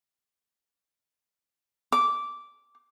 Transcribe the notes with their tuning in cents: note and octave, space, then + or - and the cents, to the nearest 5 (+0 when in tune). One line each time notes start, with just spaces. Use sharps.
D6 -10